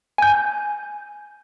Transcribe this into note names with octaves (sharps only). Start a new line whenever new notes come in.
G#5 G6